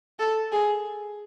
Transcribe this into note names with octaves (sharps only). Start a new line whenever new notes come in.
A4
G#4